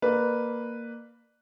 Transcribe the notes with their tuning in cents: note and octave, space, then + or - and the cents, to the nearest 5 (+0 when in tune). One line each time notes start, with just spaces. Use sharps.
A#3 +0 B4 +0 D5 +35